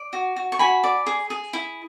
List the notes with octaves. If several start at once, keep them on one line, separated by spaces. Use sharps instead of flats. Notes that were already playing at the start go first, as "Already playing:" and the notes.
Already playing: D5
F#4
F#4
C#6
F#4 G#5 B5
D5
G#4
G#4
E4